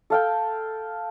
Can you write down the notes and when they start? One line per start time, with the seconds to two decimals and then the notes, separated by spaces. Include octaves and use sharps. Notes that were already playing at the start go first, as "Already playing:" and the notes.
0.10 A4 F5 G5